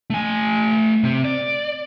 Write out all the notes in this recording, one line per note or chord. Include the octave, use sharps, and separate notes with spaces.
A3 G#5
C3 C4
D5